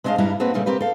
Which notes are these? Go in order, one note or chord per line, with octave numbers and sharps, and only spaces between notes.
G#3 B3 C4 D4 D#5 F5
G2 G3 D4 E4 A#5
A#3 C4 D4 F#4 B4
A#2 C#3 G3 A3
C4 G4 A#4 B4
A4 F5